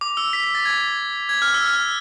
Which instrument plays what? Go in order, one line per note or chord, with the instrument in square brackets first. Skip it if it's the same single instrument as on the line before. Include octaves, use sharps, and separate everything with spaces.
[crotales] D6
E6
B6
B6
A6
G#6
G#6
F6
E6
F6